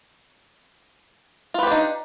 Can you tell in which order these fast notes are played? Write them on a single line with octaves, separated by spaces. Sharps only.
F4 B4 G4 D4 D#4